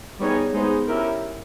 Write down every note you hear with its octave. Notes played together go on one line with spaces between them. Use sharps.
G3 B3 D#4 G#4 C#5
G#3 B3 D#4 G#4 C5
C#4 E4 G4 A#4